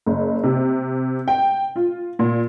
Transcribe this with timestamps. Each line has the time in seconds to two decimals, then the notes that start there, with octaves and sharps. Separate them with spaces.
0.06 F#1
0.44 C3
1.28 G5
1.76 F4
2.19 A#2